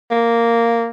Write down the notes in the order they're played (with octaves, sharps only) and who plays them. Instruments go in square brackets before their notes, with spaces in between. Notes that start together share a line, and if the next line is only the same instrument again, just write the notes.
[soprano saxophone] A#3